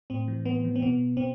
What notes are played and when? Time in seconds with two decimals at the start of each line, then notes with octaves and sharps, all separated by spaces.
0.10 A2 C4
0.28 E3
0.45 A2 B3
0.65 E3
0.76 C4
0.82 B2 B3
1.17 B2 C4